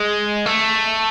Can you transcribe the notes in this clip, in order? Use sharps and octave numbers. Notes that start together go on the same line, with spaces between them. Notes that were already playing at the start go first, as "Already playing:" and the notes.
Already playing: G#3
A3